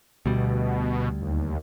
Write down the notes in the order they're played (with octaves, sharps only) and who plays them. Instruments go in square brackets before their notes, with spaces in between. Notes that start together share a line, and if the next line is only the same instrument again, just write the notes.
[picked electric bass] D2 G3 [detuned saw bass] B2
[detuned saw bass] D#2